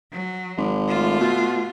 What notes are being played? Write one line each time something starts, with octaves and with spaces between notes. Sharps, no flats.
F#3
G#1
A3 F4
B2